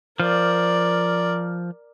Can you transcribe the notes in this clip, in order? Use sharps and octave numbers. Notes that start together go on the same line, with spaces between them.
F3 A#4 D5